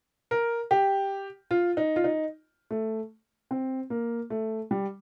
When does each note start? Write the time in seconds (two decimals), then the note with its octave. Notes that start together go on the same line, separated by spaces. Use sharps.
0.31 A#4
0.71 G4
1.51 F4
1.77 D#4
1.96 F4
2.04 D#4
2.71 A3
3.51 C4
3.90 A#3
4.30 A3
4.71 G3